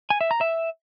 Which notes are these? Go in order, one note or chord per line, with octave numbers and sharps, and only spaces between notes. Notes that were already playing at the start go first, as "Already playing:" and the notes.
G#5
E5
A#5
E5